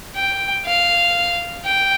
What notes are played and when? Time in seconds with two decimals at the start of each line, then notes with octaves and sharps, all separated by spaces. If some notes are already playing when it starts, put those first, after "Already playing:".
0.16 G5
0.66 F5
1.65 G5